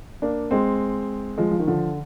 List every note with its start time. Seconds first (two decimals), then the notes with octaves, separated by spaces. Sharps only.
0.22 A#3 D4
0.51 G#3 C4
1.38 F3 G#3
1.51 F3
1.59 D#3
1.67 D3 F3